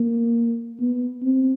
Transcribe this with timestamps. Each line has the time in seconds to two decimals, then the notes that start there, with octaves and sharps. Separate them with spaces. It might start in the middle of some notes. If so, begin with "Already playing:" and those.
Already playing: A#3
0.80 B3
1.23 C4